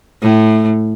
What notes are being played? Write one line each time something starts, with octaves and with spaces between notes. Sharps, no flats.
A2